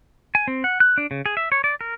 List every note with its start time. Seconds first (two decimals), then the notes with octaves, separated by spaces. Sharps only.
0.35 G#5
0.48 C4
0.64 F#5
0.80 F#6
0.98 D4
1.11 C#3
1.26 G#4
1.37 E5
1.52 C#5
1.64 D5
1.81 A#4